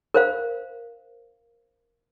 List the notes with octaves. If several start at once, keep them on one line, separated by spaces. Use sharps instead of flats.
A#4 C5 F5